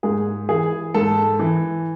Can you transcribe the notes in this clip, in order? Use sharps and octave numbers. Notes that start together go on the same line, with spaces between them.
G#2 G#4
E3 G#4
G#2 A4
E3